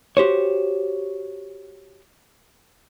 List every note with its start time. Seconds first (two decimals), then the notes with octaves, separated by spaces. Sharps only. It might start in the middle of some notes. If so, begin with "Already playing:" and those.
0.17 F#4 G4 C5 C#5